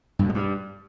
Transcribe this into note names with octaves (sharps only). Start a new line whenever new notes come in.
G2
B2
G#3
G2